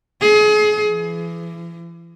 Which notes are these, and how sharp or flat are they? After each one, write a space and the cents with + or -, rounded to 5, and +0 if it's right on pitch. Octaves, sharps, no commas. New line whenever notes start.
G#4 +30
E3 +40